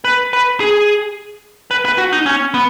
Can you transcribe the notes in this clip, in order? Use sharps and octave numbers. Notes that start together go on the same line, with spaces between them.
B4
B4
G#4
B4
B4
F#4
D#4
C#4
B3